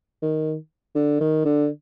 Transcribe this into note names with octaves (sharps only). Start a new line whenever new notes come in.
D#3
D3
D#3
D3